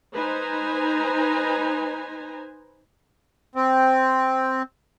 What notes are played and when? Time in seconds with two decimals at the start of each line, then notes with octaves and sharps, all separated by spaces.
0.14 D#4 B4 C5 G#5 A#5
3.55 C4